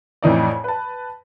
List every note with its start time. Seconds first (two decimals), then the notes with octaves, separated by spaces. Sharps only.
0.23 F2 A2 E3 D#4 D5
0.64 B4 A5